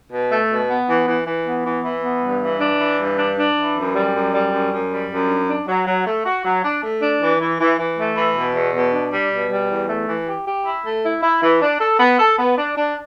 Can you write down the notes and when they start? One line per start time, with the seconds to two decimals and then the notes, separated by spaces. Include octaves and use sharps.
0.12 B2
0.31 A3
0.50 B2
0.69 B3
0.89 E3
1.08 E3
1.27 E3
1.46 B3
1.65 E3
1.85 E3
2.03 B3
2.23 G2
2.42 E3
2.61 D4
2.80 E3
3.00 G2
3.19 D4
3.38 D4
3.57 E3
3.76 F#2
3.95 G3
4.14 F#2
4.34 G3
4.53 F#2
4.72 F#2
4.91 G3
5.10 F#2
5.29 D4
5.49 D4
5.68 F#3
5.87 F#3
6.06 A3
6.25 F#4
6.45 F#3
6.64 D4
6.82 A3
7.01 D4
7.21 E3
7.40 E3
7.60 E3
7.79 E3
7.98 A3
8.17 E3
8.36 B2
8.56 E2
8.74 B2
8.93 D4
9.13 G3
9.32 B2
9.51 G3
9.70 E2
9.89 A3
10.08 E3
10.27 G4
10.47 G4
10.66 E4
10.85 A3
11.04 E4
11.23 E4
11.43 E3
11.62 D4
11.80 A4
12.00 B3
12.19 A4
12.38 B3
12.58 D4
12.76 D4